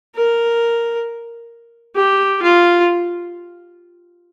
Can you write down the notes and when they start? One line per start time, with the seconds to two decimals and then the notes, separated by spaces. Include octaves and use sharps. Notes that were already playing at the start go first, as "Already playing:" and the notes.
0.16 A#4
1.96 G4
2.42 F4